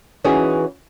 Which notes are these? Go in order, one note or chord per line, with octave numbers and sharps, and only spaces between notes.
E3 C#4 D#4 F#4 G#4